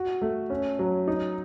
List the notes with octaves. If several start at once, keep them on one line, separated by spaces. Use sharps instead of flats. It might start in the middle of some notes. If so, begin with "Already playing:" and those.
Already playing: F#4
A3
C#4
F#3
D#4